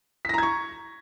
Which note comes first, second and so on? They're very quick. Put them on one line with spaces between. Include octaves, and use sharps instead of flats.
B6 A#6 A#5 G#6 C#6